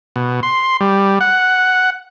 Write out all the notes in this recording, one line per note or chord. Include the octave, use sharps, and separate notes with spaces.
B2
C6
G3
F#5